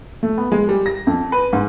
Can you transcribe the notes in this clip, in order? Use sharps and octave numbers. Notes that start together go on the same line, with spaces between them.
A3
B3
G#3
G3
A#6
F2
B4
G#2